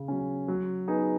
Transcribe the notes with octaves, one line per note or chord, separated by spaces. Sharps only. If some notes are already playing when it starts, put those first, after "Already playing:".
Already playing: C#3
F#3 C#4
F#3
B3 D#4 G#4